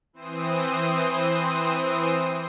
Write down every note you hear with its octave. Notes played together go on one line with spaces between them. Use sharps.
E3 C4 C5 D#6